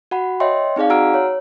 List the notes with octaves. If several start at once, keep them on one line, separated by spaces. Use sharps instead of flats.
F#4 F#5 B5
C#5 D#5 E5 G5 C6
C4 D#4 G#4 D5 F5
F#4 F#5 A#5 E6 F6 D7
C#5